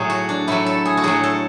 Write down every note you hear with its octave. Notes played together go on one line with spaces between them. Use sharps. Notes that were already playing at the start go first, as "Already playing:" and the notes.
Already playing: A2 F#3 G#4
F#4
D4
A2 F#3 E4
A4
G#4
F#4
A2 F#3 G#4
A4